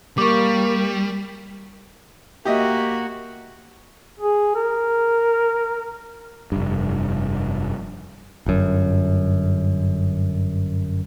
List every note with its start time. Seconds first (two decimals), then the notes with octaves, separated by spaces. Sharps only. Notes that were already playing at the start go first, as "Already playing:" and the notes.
0.18 G3 A#3 A#4 C#6 D6
2.45 A#3 F#4 G4 D#5 E5
4.20 G#4
4.55 A#4
6.52 F1 G2
8.46 G1 F#2